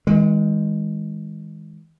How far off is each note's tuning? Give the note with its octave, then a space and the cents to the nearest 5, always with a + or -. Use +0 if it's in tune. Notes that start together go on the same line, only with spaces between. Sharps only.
D#3 +40 G#3 -15